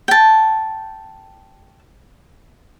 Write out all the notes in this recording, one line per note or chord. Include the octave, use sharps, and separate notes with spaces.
G5 A5